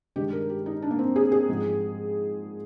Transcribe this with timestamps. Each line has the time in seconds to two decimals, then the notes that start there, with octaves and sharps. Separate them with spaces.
0.16 G2 D#3 G#3 G4
0.33 A#4
0.50 G4
0.66 D#4
0.82 D4
0.91 A#3
0.99 C4
1.16 G#4
1.32 G#4
1.49 G#2 F3 G#3